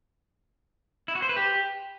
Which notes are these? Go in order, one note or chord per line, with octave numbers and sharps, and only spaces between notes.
E4
F#4
C5
B4
G4